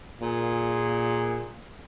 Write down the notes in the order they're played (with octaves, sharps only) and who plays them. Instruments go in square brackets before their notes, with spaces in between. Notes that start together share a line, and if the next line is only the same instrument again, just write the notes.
[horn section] A#2 G#4